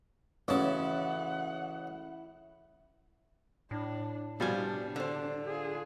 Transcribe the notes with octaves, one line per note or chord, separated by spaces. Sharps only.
A1 C#3 C#4 E4 F#4 F#5 A5
A2 D4
C2 B2 F3 G3 D4 G#5
D3 C5
F4 G#4